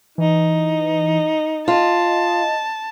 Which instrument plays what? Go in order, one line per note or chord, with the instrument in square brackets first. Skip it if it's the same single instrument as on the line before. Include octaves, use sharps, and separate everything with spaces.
[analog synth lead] E3 [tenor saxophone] D#4
[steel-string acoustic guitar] F4 [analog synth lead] D#5 [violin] A5